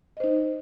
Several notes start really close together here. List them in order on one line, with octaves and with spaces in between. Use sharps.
D#5 C5 D#4